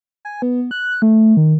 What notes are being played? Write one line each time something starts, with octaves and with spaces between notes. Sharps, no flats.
G#5
B3
F#6
A3
D#3